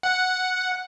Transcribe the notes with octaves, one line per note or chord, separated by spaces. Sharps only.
F#5